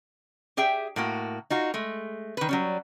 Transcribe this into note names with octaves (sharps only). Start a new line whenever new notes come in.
G4 G#4 E5 G5
A2 A#3 F#4
D#4 F4 F#4
G#3 A3
D#3 B4
F#3 G3 C#4